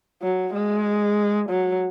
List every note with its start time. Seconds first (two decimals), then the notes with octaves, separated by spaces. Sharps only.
0.22 F#3
0.53 G#3
1.49 F#3